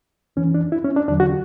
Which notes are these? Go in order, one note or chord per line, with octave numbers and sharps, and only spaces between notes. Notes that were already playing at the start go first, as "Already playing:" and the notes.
F#2 E3 C#4
D4
E4
C#4
D4
E2 D3 F#3 D4
F#4